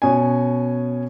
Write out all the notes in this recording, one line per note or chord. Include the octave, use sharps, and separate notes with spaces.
B2 C#4 G#5